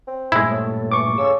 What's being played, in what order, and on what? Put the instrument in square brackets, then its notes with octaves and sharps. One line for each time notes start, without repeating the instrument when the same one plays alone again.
[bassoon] C4
[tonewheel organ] G2 A#2 A3 [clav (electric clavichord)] G#3 E4
[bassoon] A2
[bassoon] E3 [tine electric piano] C#6 D6
[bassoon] C#3 [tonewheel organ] A4 E6